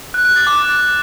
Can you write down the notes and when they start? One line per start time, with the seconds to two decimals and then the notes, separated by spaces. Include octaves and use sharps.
0.14 F#6
0.25 F#6
0.36 A6
0.47 D6